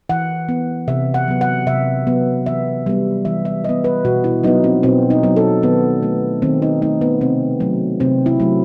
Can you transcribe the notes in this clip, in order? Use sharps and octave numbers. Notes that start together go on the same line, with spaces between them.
E3 F#5
B3
C3 E5
F#5
F#3 B3
F#5
C3 E5
F#3 B3
E3 E5
G3 B3
E3 E5
E5
G3 B3 D#5
B4
B2 F#4
E4
F#3 B3 D#4
C4
B2 C4
D#4
F#3 B3
A4
D#3 B3
A3
D#3 C4
D#4
A3 D#4
B3
C3 C4
F#3 A3
C3 C4
E4
F#3 A3